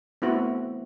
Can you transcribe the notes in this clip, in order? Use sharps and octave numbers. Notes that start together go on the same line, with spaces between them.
A3 B3 C4 E4 F#4